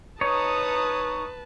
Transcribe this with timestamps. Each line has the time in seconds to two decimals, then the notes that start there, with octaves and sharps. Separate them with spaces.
0.21 D#4 B4 C#5 A5 A#5 D#6